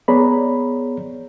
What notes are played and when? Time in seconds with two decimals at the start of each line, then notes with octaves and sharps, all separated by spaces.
0.08 B3 G#4 C#5 D5 A#5 B5